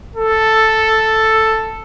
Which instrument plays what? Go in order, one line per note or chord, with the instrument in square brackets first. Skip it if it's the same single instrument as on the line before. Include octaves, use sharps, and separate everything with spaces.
[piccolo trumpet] A4